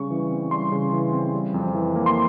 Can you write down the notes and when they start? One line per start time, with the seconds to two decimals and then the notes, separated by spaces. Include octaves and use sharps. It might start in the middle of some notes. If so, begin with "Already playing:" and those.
Already playing: C#3 G3 C#6
0.10 E3
0.30 C4
0.51 G3 C6
0.72 C#3
0.93 E3
1.13 C4
1.34 G3
1.54 F2
1.75 E3
1.95 A#3
2.06 C6